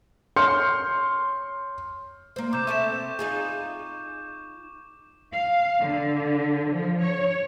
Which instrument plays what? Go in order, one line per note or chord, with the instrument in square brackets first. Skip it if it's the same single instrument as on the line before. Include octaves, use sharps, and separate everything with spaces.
[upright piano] C#5 C6 F6 G6 C#7
[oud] A#3 C5
[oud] C3 [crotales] D6 G6 E7
[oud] C4 A4 E5 [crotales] C#6 E7
[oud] D#4 F4 G#4
[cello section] F5
D3
F3
C#5